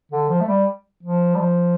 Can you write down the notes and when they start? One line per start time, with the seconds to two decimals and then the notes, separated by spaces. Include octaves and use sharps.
0.12 D3
0.29 F3
0.41 A3
0.48 G3
1.03 F3
1.35 G3
1.40 F3